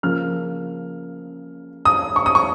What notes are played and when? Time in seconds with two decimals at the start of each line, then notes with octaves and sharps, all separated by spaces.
0.03 C#3 F3 A#3 F6
1.85 D#6
2.16 C#6
2.26 D#6
2.35 C#6